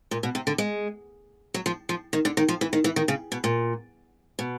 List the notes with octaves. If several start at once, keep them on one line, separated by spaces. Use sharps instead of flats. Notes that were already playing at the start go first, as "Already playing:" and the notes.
A#2
B2
C3
D3
G#3
F#3
F3
F3
D#3
D3
D#3
F3
E3
D#3
E3
D#3
C#3
B2
A#2
B2